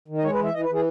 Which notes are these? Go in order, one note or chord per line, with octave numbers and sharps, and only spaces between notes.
D#3
D#5
G#3 C#5
B4
E3
E5
E3 D#5
B4
E3
G#4